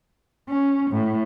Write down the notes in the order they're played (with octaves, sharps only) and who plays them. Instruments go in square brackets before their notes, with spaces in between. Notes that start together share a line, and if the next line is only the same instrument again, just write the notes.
[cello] C#4
A2